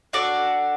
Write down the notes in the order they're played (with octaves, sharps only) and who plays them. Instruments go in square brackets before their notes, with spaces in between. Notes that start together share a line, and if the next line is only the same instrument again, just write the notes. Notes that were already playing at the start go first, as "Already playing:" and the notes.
[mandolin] D4 F#4 A4 D5